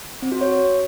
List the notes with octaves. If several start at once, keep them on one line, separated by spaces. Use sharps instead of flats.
C4
F#4
C#5